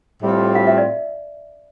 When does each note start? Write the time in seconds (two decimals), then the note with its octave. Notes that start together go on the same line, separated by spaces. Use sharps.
0.23 A2 G3 C4 F4 A4
0.55 F5
0.67 E5
0.78 D5